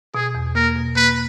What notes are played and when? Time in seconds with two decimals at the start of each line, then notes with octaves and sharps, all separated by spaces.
0.15 B2 G#4
0.35 E2
0.55 A#3 A#4
0.76 B2
0.96 A#3 B4